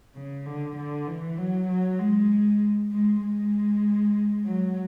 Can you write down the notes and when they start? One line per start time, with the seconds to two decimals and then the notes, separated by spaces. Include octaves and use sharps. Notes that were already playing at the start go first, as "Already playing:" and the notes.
0.15 C#3
0.46 D3
0.76 D3
1.07 E3
1.38 F#3
1.68 F#3
1.99 G#3
2.92 G#3
3.22 G#3
4.46 F#3